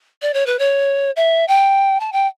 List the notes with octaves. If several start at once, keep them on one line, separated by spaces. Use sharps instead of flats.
D5
C#5
B4
C#5
E5
G5
A5
G5